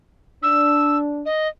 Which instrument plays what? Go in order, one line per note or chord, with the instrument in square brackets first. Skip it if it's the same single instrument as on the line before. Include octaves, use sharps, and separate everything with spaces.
[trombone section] D4 [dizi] E6
[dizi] D#5